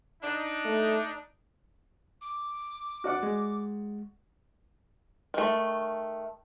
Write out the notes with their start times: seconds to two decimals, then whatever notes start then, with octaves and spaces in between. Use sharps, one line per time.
0.23 D4 D#4
0.65 A3
2.21 D6
3.04 F#4 D5 F#5
3.23 G#3
5.34 D#3 A3